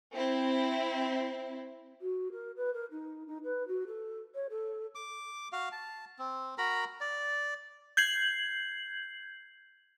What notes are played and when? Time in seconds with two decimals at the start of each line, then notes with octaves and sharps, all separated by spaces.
0.14 C4 E4
2.00 F#4
2.32 A#4
2.56 B4
2.73 A#4
2.91 D#4
3.27 D#4
3.44 B4
3.67 F#4
3.87 A4
4.34 C#5
4.49 A4
4.95 D6
5.52 F#4 F5
5.72 A5
6.19 C4
6.58 F#4 A#4 A#5 B5
7.01 D5
7.97 G6 G#6 C7 F#7